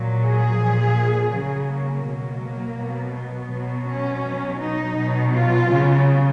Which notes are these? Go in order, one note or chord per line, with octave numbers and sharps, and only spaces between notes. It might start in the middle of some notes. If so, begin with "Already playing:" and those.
Already playing: A#2 F#3
G#4
A#2 F3
C#3 F#3
A#3
B2 F#3
A#3
B2 F#3
B3
B2 F#3
C#4
B2 F#3
D#4
B2
F#3
F4
C#3 F#3